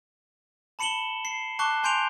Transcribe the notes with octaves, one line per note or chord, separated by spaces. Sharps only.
A5 B5 C#7 E7 F#7 G7
C7
A5 C#6 D6 F#6 C7 G7
G#5 C6 G6 C7 D7 F7